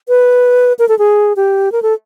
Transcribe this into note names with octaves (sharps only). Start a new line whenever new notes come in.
B4
A#4
A4
G#4
G4
A#4
A4